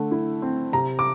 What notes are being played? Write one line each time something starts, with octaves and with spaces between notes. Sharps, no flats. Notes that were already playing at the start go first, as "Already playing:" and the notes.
Already playing: D3 A3
E4
C4
C3 A#5
D6